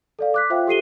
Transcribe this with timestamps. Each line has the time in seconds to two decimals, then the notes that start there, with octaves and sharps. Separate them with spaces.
0.19 A4 D5 F5
0.34 D6 F#6 B6
0.50 F4 C5 E5 F5 G5
0.67 G4 A4 C7 D#7 G7